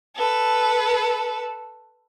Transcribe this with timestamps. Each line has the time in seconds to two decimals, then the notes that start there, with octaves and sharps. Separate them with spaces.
0.16 A4 B4